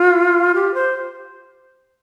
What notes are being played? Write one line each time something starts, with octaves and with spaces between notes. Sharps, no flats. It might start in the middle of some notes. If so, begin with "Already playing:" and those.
Already playing: F4
G4
C5